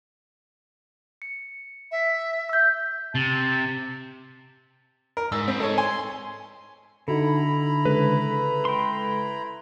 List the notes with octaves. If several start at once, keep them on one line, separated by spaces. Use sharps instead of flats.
C#7
E5
E6 G6
C3 A5
A#4
G#2 E6
A3 C4 B4
G#3 D#4 A4 C#5
G#5 C6
D3 D#4 E4 F#4 A4 A#5 B5
C#3 G#3 A4 B4
G5 C6